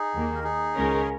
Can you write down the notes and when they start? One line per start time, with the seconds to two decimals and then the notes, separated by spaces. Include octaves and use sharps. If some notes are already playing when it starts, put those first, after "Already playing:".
Already playing: D#4 G#4
0.14 D#2 D#3 A#3
0.35 A#4
0.44 D#4 G#4
0.75 C#2 C#3 G#3 C#4 A#4